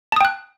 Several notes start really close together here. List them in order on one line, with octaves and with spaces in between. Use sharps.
A5 D#6 G5 F#6